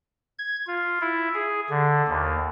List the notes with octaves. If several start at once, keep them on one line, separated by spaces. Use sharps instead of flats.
G#6
F4
E4
G#4
D3
D#2